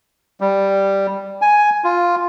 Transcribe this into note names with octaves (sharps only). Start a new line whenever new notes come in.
G3
G#5
F4